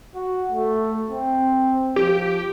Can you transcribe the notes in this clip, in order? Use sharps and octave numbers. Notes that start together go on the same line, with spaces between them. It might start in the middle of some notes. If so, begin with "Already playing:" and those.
F#4
A3
C4
F3 G4